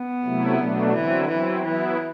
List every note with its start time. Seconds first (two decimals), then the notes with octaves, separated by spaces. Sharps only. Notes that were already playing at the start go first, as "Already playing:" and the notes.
Already playing: B3
0.24 C3 F#3 A3 E4
0.58 B2 F#3 A3 D4
0.93 D3 E3 F#3 C4 E4
1.28 E3 F#3 C4 E4
1.63 E3 F#3 B3 E4